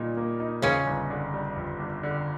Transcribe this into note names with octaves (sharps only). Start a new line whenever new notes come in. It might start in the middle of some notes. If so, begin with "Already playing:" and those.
Already playing: A#2 G3 A#3 D#4
A#3
D#4
F2 C#3 C#4
G1
D3
G3
F2
G1
D3